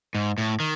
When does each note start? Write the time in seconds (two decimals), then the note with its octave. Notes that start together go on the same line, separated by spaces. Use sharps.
0.15 G#2
0.38 A2
0.60 D#3